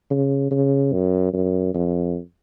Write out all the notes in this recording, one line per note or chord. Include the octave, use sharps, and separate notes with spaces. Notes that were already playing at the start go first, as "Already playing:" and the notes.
C#3
C#3
F#2
F#2
F2